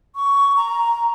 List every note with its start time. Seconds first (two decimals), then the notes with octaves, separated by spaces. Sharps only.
0.16 C#6
0.57 A#5